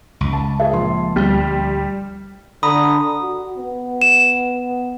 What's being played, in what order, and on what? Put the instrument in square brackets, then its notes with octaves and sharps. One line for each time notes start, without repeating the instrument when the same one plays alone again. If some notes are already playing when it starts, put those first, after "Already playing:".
[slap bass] C#2
[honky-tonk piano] A5
[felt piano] G#4 E5
A#1 C6
[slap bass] D2 [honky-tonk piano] G3
[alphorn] D3 [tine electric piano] A#5 B5 [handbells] D#6
[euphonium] F#4
B3
[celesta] E7